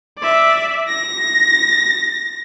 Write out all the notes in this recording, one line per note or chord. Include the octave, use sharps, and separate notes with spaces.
D5 E5
A#6